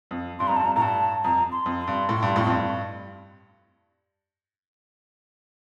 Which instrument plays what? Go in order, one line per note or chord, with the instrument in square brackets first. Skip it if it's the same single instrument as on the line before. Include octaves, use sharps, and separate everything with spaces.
[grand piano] F2
[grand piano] G2 [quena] C6
[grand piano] F2 [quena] A#5
[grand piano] G2 [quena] A5
[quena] A#5
[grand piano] A2 [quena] A#5
[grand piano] G2 [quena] A5
[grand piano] F2 [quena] A#5
[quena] C6
[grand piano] F2
[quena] C6
[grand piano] G2
A2
G2
F2 A2
F2
G2